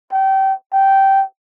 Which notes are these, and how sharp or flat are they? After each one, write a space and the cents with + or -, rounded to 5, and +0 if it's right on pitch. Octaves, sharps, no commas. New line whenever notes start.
G5 -25
G5 -10